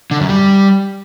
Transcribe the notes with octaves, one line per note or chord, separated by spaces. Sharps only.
D3
F#2
G3